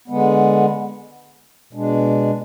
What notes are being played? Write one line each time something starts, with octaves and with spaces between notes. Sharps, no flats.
D3 G#3 B3
B2 G#3 D4